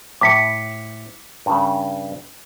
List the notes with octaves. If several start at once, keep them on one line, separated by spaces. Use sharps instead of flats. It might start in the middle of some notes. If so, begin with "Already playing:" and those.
A2 D6 B6 C#7
G2 C#3